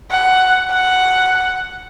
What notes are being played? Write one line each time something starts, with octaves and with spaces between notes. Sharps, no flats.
F#5
F#5